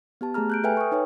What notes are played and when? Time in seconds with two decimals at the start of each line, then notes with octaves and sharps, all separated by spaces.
0.21 B3 G4 A5
0.34 A3 G4 G#4 A#5 F6
0.50 F#6 G6 D7
0.64 A4 B4 E5 G5 G#5 F6
0.77 C#6 D#6
0.92 D#4 B4 C#5 G5